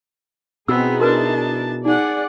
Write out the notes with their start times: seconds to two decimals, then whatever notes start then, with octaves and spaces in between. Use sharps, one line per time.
0.68 B2 B3 C4 D#4 E4 G#4 E6
1.00 D4 F#4 A#4 B4 A5
1.85 D#4 G#4 D5 F#5